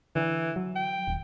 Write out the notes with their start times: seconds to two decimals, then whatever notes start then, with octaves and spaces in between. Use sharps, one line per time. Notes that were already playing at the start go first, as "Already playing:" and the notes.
0.16 D3 E3
0.56 F#3
0.76 G5
1.07 D#1